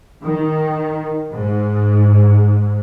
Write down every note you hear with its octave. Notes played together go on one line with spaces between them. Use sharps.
D#3
G#2